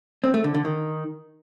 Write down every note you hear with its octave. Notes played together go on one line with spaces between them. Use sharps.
C4
A3
D3
D3
D#3